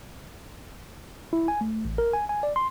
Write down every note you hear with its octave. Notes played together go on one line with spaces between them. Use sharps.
E4
G#5
A3
A1
A#4
G#5
G#5
D5
C6